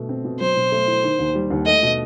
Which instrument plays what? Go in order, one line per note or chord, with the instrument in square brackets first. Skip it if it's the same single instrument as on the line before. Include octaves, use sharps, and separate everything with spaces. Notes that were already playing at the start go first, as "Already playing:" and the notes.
Already playing: [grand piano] B2 A3
C4
B2
[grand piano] F#3 [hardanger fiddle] C5
[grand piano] B2
A3
E4
D#3
D#2
G3
D#2
[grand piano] A3 [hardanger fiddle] D#5
[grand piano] B2